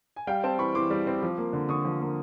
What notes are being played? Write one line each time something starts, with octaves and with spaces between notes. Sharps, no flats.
G#5
G3 F5 G5
C4 G5 A5
E3 B5 C#6
E3 C6 D6
G3
C4
F3
A#3
D3
D3 C#6 D#6
F3
A#3